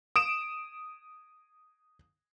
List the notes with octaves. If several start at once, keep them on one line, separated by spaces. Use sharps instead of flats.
D#6 D7 E7